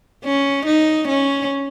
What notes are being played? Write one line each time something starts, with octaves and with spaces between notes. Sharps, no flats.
C#4
D#4
C#4